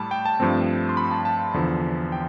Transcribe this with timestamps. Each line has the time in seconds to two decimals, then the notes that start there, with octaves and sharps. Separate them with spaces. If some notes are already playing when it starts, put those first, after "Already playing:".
Already playing: A2 G3 A5 B5
0.11 G5
0.25 A5
0.40 G2 F3 A3 C4
0.89 C6
0.97 B5
1.11 A5
1.25 A5
1.54 E2 D3 F3
2.12 G5